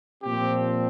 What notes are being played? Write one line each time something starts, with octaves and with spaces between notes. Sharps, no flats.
A#2 F3 C4 G4